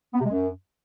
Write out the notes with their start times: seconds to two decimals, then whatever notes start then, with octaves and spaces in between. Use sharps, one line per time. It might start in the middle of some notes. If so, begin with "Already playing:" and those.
0.13 B3
0.19 C3
0.25 G#3
0.31 F#2